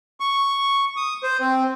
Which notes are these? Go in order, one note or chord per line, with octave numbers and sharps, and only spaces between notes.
C#6
D#6
C5
C4